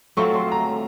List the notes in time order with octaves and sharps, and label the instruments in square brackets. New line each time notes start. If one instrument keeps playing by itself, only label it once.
[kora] F#3 A3 C4 F4 [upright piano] C#6
[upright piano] C6
A#5